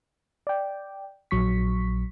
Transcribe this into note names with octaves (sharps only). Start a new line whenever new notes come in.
D5 G5
A#1 F#3 C#6 B6